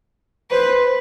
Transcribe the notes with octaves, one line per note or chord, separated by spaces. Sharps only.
B4 C5